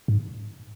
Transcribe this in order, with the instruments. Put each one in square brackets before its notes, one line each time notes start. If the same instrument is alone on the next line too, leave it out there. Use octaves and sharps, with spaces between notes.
[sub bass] G#2